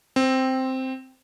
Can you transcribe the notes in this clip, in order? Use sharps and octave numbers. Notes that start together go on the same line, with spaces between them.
C4